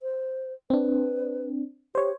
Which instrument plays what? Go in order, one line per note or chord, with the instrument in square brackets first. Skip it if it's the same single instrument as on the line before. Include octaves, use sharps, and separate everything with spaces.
[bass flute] C5
[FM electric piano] C4 D4 [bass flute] B4
[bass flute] G4 [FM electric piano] C5 C#5